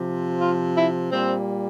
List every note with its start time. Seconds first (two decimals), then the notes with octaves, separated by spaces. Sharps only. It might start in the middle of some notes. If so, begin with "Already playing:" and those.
Already playing: C3 F3
0.41 F4
0.76 E4
1.12 A#2 G3 C4